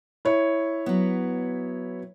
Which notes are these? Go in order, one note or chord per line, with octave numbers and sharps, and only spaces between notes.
E4 C#5
F#3 B3